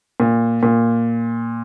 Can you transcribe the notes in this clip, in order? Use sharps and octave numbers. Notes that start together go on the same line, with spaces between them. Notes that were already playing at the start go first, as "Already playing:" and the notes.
A#2
A#2